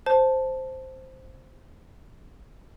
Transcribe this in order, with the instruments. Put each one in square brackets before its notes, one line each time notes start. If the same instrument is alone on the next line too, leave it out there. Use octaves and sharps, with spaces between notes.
[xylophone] C5 A5